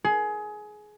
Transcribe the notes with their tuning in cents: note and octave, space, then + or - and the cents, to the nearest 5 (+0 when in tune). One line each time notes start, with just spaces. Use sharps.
G#4 +20